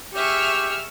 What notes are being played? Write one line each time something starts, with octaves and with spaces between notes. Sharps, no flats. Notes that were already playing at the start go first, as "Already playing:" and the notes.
G4 G#4 E5 C#6 E6 F6